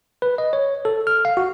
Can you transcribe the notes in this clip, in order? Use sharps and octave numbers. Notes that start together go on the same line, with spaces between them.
B4
D#5
C#5
A4
F6
F5
F#4